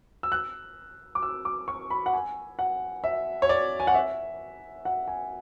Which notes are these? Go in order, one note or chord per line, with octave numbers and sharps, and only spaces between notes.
E6
F#6
D6
E6
D6
C#6
B5
F#5
G#5
F#5
E5
C#5
D5
G#5
F#5
E5
F#5
G#5